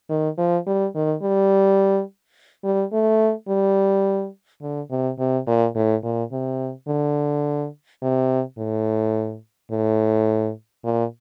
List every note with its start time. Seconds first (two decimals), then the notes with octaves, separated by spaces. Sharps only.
0.09 D#3
0.38 F3
0.66 G3
0.95 D#3
1.22 G3
2.64 G3
2.92 A3
3.48 G3
4.61 D3
4.90 C3
5.19 C3
5.47 A#2
5.75 A2
6.03 A#2
6.32 C3
6.88 D3
8.02 C3
8.58 A2
9.71 A2
10.84 A#2